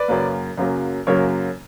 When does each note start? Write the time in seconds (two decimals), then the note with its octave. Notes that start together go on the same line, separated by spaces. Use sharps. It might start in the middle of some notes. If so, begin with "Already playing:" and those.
Already playing: B4 D5
0.08 F#2 C#3 F#3 A#3
0.58 F#2 C#3 F#3 A#3
1.07 F#2 C#3 F#3 A#3 A#4 C#5